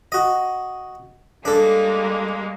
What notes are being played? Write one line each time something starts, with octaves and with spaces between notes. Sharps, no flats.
F#4 D#5
G3 G#3 A#3 D4 A4